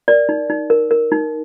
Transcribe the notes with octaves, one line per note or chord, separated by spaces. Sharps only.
A#4 D5
D#4
D#4
A#4
A#4
D#4